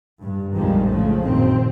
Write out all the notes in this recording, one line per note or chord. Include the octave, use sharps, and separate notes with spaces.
G2
A#1 F2 D#3 F3 G3 G#3
A2 C#3 F3 G#3 A3
F#1 A#2 D#3 C4